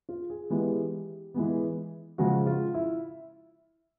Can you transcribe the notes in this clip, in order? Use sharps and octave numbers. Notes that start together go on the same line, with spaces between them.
F4
G#4
E3 G#3 B3 G4
E3 G#3 B3
C#3 F3 G#3 F#4
F4
E4